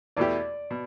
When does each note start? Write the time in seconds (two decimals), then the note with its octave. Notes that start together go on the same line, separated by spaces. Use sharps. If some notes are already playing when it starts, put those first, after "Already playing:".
0.17 E2 B2 A3 E4 G4 D5
0.71 B2